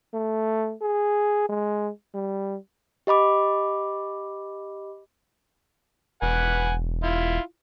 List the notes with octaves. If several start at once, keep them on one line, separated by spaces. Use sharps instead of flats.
A3
G#4
G#3
G3
G4 D#5 B5 D6
E1 B4 F#5 G#5
E4 F4